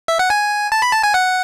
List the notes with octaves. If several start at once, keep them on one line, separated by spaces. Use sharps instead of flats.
E5
F#5
G#5
A5
B5
A5
G#5
F#5